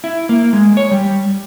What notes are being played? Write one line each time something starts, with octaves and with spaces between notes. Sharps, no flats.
E4
A#3
G#3
C#5
G3